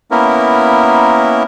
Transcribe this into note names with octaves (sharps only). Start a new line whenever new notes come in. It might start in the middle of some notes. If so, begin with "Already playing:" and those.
A#3 B3 C#4 E4 A#4